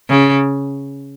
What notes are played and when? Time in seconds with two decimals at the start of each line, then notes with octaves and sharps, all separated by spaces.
0.09 C#3